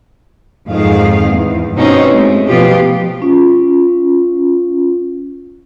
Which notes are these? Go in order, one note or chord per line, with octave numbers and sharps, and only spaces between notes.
F2 G#2 D#3 G#4 F5
E2
G2 B2 C4 C#4 D#4
G#3 A3
B2 F3 B3 F4 G4
C#4 F4